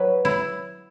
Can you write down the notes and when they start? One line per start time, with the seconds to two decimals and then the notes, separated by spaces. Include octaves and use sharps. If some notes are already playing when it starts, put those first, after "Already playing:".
Already playing: F#3 B4
0.25 E4